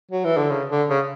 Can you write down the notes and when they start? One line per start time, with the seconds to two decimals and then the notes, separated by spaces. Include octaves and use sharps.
0.11 F#3
0.24 E3
0.37 D3
0.50 C#3
0.69 D3
0.89 C#3